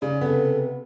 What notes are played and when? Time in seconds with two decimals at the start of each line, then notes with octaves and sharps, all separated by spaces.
0.02 C#3 D5
0.21 C3 B3 A4